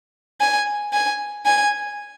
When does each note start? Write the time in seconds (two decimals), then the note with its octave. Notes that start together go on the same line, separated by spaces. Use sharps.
0.41 G#5
0.93 G#5
1.46 G#5